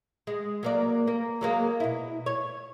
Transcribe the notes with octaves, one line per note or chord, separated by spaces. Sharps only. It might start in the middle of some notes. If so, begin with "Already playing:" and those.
G#3
F#3 A#3 D5
A#3
F#3 G#3 A#3
B2 E4
C#5